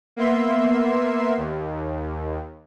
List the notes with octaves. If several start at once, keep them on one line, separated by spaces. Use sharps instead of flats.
A#3 B3 E5 C6
D#2